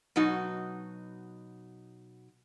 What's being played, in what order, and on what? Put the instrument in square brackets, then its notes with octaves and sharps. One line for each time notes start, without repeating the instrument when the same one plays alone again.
[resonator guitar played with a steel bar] B2 F#3 D#4 F#4